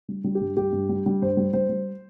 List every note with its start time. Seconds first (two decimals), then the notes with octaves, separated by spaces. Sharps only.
0.08 G3
0.24 G3
0.35 G4
0.41 G2
0.57 G2 G4
0.73 G2
0.89 G3
1.06 G3
1.22 G2 C5
1.37 G3
1.53 G3 C5
1.69 G3